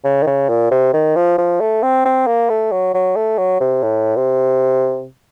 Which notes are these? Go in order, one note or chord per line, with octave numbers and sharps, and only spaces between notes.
C#3
D#3
C#3
A#2
C3
D#3
F3
F3
A3
C4
C4
A#3
A3
F#3
F#3
A3
F#3
C3
A2
C3